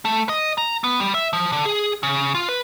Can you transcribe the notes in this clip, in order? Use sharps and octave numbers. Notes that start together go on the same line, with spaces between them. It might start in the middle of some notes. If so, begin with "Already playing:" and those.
A3
D#5
A#5
B3
G3
E5
F3
D3
G#4
C#3
F4
B4